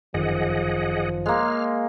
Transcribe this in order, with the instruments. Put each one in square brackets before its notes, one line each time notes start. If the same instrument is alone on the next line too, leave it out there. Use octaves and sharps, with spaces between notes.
[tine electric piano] G1 F#2 D#3 [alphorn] F3 [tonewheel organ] G#4 D#5 F#5
[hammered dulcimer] G#3 A#3 [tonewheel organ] F6